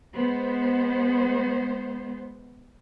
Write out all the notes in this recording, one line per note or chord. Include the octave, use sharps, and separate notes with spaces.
G#3 B3 C5